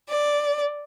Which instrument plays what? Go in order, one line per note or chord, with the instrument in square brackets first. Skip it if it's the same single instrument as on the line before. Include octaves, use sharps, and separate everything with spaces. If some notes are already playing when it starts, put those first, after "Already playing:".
[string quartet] D5